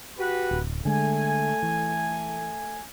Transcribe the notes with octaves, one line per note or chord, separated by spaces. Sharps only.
F#4 G4 B4
D1
D3 G#3 A3 G#5
E3